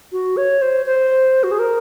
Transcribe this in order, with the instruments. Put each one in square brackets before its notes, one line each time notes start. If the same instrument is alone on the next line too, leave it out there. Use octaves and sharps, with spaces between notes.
[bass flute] F#4
C#5
C5
C5
F#4
G#4
A#4